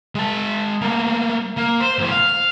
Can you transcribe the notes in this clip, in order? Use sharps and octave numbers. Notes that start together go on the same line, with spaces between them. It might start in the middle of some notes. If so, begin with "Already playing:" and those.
G#3 A5
A3 A#3
A#3
C5
E2 A2
F5